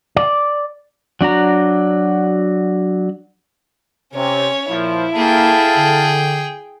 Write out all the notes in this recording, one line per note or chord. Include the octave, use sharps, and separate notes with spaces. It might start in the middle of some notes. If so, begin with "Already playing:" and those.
D5
F#3 D4 F#4 A#5
C3 C#4 C#5
A#2 F3 E4
A#3 G#4 A4 F5 G5 A5
D3